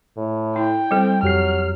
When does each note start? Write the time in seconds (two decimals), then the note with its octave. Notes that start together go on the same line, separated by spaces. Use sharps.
0.17 A2
0.56 E4 G5
0.91 G3 C4 A4
1.23 F2 F#3 G4 F6 C7